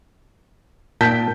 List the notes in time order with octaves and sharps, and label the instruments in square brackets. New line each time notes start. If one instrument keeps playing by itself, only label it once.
[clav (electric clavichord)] A#2 G5 [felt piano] A5 G6 B6